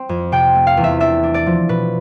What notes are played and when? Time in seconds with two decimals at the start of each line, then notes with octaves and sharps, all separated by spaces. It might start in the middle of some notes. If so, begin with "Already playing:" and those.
Already playing: C4
0.09 F2
0.32 C3 G5
0.55 A3
0.67 F5
0.77 E2
0.84 E5
1.00 D4 E5
1.23 D4
1.34 D5
1.46 F3
1.69 B2 B4